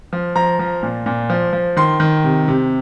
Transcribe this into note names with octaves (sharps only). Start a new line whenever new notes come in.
F3
F3 A#5
F3
A#2
A#2
F3
F3
D#3 C6
D#3
C3
C3